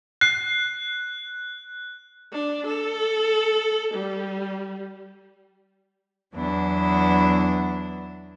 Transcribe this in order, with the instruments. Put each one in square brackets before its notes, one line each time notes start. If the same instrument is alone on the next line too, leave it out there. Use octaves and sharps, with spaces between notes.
[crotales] F#6 [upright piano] C7
[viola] D4
A4
G3
[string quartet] E2 F#3 B3 D4 E4